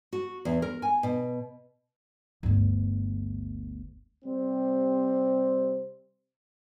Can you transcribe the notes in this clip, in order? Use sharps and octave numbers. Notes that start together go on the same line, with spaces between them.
F#4
E2
A#4
G#5
B2
G1 D2
C3 G3 C4